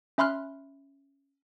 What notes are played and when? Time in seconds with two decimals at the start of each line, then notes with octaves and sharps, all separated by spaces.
0.18 C#4 E5 B5 C6 F6 F#6